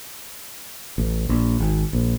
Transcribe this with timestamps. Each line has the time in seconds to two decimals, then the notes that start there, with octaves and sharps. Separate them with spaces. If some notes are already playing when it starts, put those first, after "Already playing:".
0.98 A1
1.29 A#1
1.60 G#1
1.93 A#1